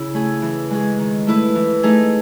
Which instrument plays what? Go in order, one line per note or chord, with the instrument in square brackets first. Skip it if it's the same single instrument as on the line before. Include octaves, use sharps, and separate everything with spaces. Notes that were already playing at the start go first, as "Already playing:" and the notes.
Already playing: [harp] C#3 E4
A3 C#4 G#4
E3
G#3 C#4 G#4
D#3
A3 E4 B4
E3
A3 D#4 G#4